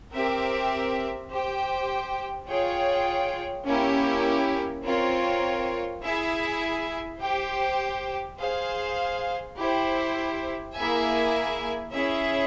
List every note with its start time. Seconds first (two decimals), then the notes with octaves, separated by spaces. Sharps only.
0.12 C4 G4 A#4 E5
1.30 G4 C5 G5
2.47 F4 G#4 C#5 G5
3.66 A#3 C#4 E4 G4
4.83 C4 F4 A#4 C#5
6.02 E4 G#4 E5 G#5
7.20 G4 C5 G5
8.38 G#4 C5 F5
9.56 E4 G4 C5
10.75 A#3 E4 G#4 E5 G#5
11.92 C#4 E4 G#4 E5